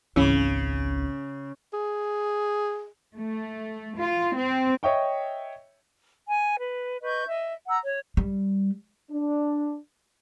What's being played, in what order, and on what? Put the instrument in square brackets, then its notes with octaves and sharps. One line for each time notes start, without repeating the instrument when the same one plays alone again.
[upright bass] G#1 C#2 [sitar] C#3 [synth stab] E3 C#4
[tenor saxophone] G#4
[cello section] A3
F4
C4
[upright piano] C#5 D#5 E5 G5 C#6
[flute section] G#5
B4
B4 D#5 C#6 G6
D#5 E5
F#5 A#5 E6
C#5
[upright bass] G3
[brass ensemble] D4